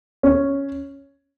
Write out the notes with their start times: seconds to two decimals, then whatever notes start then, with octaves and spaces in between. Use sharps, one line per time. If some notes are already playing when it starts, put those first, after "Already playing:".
0.23 C#4